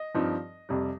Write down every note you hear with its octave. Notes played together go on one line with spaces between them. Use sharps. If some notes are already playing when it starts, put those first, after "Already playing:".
Already playing: D#5
G2 F3 C4 D#4
F2 C3 G3